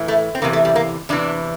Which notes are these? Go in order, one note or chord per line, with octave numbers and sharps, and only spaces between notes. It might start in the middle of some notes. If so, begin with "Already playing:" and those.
Already playing: A2 E3
A3
C4
E2 C3 E3 A#3
A3
G3
A#3
E2 C3 E3 D4